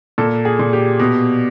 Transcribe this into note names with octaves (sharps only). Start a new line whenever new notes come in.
A#2 A4
G#4
A#2
G4
B2